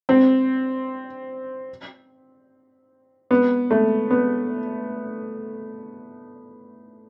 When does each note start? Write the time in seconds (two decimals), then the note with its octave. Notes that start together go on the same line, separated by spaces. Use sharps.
0.09 C4
3.31 B3
3.71 A3
4.11 B3